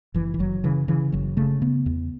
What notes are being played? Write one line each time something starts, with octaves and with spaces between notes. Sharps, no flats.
F#1 E3
E3
F#1 F#3
C#3 E3
C#3 E3
F#1 F#3
C#3 A3
C#3 B3
E2